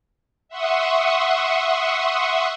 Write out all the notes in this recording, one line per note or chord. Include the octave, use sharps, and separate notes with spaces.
E5 F#5 C6 C#6 D#6